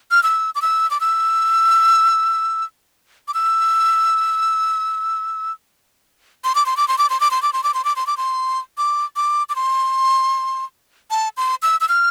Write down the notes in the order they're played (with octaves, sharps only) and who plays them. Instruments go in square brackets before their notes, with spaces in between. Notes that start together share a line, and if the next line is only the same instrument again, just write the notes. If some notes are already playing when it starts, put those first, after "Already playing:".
[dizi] F6
E6
D6
E6
D6
E6
D6
E6
C6
D6
C6
D6
C6
D6
C6
D6
C6
D6
C6
D6
C6
D6
C6
D6
C6
D6
D6
D6
C6
A5
C6
E6
E6
F6